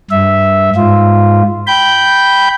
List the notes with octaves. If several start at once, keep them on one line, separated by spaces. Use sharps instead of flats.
G2 E5
G#2 F4
G5 B5 G6